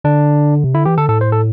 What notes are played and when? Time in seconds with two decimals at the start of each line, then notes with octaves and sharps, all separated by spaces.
0.04 D3 D4
0.64 C3
0.74 D3 E4
0.85 E3 G4
0.98 D3 A4
1.09 A2 A4
1.21 C5
1.32 A4